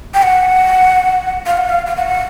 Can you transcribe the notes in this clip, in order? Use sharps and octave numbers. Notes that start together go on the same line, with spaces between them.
G5
F#5
F5
F#5
F5
F5
F#5